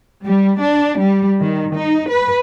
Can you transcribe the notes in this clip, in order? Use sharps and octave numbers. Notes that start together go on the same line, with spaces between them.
G3
D4
G3
D#3
D#4
B4